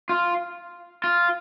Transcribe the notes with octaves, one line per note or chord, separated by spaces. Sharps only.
F4
F4